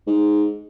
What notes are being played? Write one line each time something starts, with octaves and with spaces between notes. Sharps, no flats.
G#2